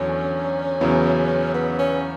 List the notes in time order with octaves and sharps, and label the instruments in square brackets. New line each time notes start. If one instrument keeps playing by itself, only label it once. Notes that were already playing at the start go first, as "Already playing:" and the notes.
Already playing: [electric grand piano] E2 D3 F#3 [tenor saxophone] C#4
[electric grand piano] E2 C#3 F#3 B3 E4
[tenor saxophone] B3
C#4